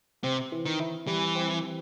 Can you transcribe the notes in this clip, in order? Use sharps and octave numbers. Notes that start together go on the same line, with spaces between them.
C3 C4
E3
D#3
E4
E3 G3
C4
E3